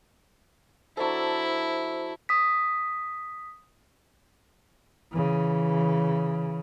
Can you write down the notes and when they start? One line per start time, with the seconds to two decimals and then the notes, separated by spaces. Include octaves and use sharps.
0.97 F#3 D4 E4 A4 C5
2.29 D#6 B6
5.12 C#3 E3